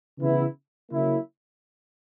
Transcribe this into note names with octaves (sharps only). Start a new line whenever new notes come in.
C#3 E3 B3 E4
C#3 F#3 A#3 E4